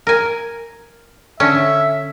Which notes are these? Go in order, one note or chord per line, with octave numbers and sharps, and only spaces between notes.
A#4 G#5
D3 C#4 E5